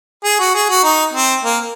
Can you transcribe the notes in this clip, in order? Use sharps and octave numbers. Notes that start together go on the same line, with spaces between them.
G#4
F#4
G#4
F#4
D#4
C4
A#3